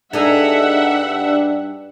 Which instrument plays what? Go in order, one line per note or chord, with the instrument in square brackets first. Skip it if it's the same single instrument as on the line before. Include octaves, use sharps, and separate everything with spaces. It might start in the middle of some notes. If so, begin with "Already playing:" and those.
[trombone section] G2 G3 D4 [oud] D#4 G#4 A4 [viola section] E5 F#5